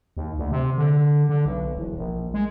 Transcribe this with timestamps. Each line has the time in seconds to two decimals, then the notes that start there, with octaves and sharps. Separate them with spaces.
0.17 D#2
0.38 D2
0.52 C3
0.78 D3
1.29 D3
1.45 B1
1.77 E1
1.97 A#1
2.34 G#3